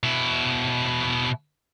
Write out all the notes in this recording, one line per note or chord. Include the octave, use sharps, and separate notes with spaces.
B2 E4